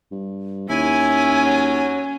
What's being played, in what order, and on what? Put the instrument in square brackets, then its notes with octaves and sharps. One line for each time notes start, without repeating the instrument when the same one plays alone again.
[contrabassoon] G2
[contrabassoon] D#2 [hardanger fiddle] C#4 [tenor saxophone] E4 [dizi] G#5
[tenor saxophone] F#3